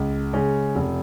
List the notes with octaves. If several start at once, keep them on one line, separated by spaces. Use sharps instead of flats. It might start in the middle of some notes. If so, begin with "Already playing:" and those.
Already playing: C#2
C#3 G#3 C#4
F1